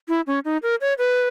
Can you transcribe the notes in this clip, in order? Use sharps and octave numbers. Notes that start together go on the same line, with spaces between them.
E4
C#4
D#4
A#4
C#5
B4